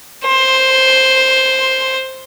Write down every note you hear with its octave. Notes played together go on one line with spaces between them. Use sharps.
C5